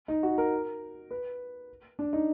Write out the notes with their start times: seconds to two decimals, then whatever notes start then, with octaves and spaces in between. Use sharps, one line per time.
0.08 D#4
0.23 F#4
0.38 A#4
1.11 B4
1.99 D4
2.13 D#4